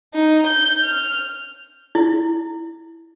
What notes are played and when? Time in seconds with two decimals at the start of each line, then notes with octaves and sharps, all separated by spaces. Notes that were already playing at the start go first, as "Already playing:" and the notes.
0.14 D#4
0.47 G6
0.84 F6
1.95 E4